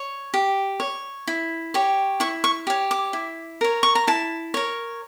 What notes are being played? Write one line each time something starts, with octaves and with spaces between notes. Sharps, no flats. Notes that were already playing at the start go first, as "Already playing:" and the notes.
Already playing: C#5
G4
C#5
E4
G4 C#5
E4 C#6
C#6
G4 C#5
D6
E4
A#4 C#5
C#6
A#5
E4 A5
A#4 C#5